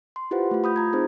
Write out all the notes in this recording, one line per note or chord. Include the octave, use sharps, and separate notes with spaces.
C6
E4 F4 G4 B4 C5 F#5
A3 F4
B5 D#6 G6
F4 A#5 G#6
C4 D#4 G#4 C5